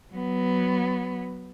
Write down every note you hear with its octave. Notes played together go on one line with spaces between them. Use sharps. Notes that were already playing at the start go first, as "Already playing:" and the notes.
F#3 B3